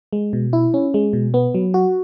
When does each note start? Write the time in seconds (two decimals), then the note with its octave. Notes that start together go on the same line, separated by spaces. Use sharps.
0.13 G#3
0.33 B2
0.53 E4
0.74 C#4
0.94 G#3
1.13 B2
1.34 B3
1.54 F#3
1.74 F#4